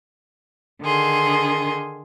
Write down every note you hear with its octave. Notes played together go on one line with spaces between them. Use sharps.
D3 D#3 G#4 C6